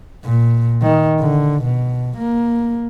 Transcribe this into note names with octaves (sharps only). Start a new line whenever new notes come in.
A#2
D#3
D3
B2
A#3